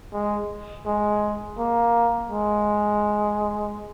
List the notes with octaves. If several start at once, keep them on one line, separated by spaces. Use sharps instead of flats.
G#3
G#3
A#3
G#3